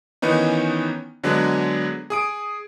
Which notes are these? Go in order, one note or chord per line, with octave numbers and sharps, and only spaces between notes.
D#3 E3 B3 C#4 D#4
D3 F#3 G#3 B3 D4
G#4 D#6 D7